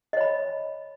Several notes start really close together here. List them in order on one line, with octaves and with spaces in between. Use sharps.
D#5 C#5 B5